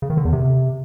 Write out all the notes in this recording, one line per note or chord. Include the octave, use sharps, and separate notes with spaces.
C#3
D#3
D3
E2
C3